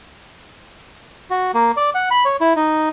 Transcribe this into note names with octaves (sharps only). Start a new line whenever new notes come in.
F#4
A#3
D5
F#5
B5
C#5
E4
D#4